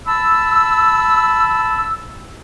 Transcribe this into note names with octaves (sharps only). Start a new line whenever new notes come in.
A5 B5 E6